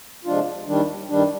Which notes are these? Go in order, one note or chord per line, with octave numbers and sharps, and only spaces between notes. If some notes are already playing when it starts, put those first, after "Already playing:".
C3 F3 G#3 D4 F4
D#2 D#3 G3 D4
G2 D#3 G3 D4